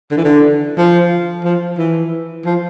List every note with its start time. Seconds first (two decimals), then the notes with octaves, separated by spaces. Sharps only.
0.11 D3
0.17 E3
0.25 D3
0.78 F3
1.44 F3
1.78 E3
2.45 F3